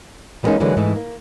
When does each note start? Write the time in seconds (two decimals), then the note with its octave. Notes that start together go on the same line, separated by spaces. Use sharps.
0.43 E3 G3 G#3 A#3 C#4 D#4
0.60 D3 E3 F#3 G#3 A#3
0.77 G#2 E3 A3 D#4
0.96 A#3